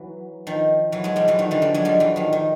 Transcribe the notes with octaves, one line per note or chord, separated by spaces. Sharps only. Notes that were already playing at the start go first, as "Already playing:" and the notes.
Already playing: E3 F#3
D#3 F3
E3 F#3
F#3 G#3
F3 G3
E3 F#3
D#3 F3
D3 E3
F3 G3
F#3 G#3
F3 G3
E3 F#3
D#3 F3
D#3